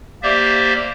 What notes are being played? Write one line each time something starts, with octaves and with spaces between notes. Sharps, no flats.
A#3 G4 C5 D5 E5